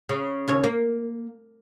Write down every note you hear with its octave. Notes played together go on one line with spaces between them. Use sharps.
C#3
D#2 C#3 C#5
A#3